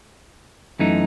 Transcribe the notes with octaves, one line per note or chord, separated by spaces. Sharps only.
F#2 E3 A3 D#4